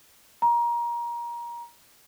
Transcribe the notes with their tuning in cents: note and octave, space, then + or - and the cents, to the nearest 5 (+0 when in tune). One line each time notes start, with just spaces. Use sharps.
A#5 +25